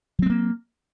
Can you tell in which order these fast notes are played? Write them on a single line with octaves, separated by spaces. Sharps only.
F#3 C4 G#3 A#3